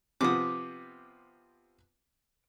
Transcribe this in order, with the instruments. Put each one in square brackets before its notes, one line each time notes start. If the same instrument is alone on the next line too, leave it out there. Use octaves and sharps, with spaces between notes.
[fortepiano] C3 F3 B3 [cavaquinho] D6 D#6